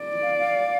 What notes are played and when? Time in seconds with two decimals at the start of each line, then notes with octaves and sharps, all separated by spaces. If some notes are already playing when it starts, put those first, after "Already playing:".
Already playing: D5
0.22 F5
0.39 F5